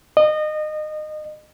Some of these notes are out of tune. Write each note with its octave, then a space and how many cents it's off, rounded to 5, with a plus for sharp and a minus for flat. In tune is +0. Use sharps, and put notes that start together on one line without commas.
D#5 -25